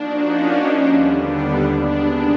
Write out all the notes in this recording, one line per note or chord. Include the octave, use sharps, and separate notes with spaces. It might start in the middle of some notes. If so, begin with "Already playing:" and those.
Already playing: F3 A#3 D4 D#4 F#4
C#4
D#2 D3 G3 B3 D4
C3 D#3 G#3 B3 D4